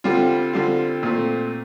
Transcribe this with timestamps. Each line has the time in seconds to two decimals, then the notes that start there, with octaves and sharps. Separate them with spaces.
0.04 D3 G3 C4 F4
0.53 D3 G3 C4 F4
1.03 A#2 A3 C4